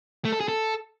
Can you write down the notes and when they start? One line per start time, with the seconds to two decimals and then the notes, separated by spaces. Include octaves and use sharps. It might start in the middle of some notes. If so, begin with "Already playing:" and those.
0.25 A3
0.33 A4
0.40 G#4
0.48 A4